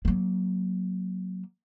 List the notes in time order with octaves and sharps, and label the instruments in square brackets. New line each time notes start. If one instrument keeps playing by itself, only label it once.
[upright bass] F#3 A#3